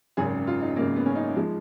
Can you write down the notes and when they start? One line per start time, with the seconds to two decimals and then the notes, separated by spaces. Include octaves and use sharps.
0.17 G#1 F#2 C#3 G#4
0.47 F4
0.61 D#4
0.76 G#1 F#2 C#3 A#3
0.96 B3
1.06 C#4
1.15 D#4
1.36 F3 G#3